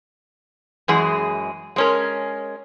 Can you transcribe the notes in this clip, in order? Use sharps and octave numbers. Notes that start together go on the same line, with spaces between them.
F#2 E3 G#3 G#4
G#3 C#4 A#4